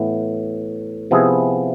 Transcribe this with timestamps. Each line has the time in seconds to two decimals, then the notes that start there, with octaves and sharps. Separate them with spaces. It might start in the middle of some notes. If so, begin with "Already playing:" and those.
Already playing: A2 E3 B3
1.11 C3 F3 B3 E4 G#4